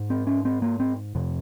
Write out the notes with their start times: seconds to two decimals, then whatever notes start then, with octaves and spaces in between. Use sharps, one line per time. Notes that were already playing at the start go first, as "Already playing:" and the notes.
Already playing: G#2
0.10 C4
0.27 C#4
0.45 C4
0.62 A#3
0.80 C4
1.15 F2 C3